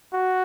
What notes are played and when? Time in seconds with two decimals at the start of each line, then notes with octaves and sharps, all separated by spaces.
0.14 F#4